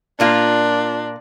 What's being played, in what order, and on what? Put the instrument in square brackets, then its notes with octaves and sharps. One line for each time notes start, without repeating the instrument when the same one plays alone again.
[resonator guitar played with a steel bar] A#2 A#3 F4 [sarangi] D4